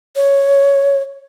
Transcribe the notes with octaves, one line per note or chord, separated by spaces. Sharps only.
C#5